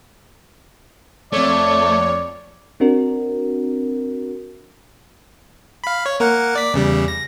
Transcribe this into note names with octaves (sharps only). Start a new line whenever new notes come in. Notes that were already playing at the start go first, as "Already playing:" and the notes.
F2 A3 C#5 D5
C4 D4 F#4 A#4
F5 B5
C#5
A#3 A#4 F#5
D5 B6
E2 C#3 G3
A#6